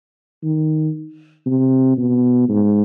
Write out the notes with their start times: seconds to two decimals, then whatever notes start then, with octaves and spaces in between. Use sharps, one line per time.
0.43 D#3
1.46 C3
1.98 B2
2.49 G#2